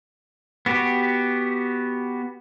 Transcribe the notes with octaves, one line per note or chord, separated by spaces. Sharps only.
B3 F#4 G4